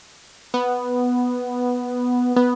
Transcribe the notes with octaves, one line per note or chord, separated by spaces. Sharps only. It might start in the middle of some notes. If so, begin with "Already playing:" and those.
B3
B3